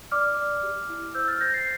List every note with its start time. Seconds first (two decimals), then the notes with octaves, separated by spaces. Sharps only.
0.11 D5 D6 F6
0.37 D5
0.63 G4
0.89 E4
1.14 C5 E6 G6
1.28 F6 A6
1.40 C5 G6 A#6
1.53 A6 C7